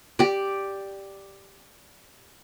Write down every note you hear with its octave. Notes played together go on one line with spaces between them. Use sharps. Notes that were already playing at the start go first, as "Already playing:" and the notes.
G4 D5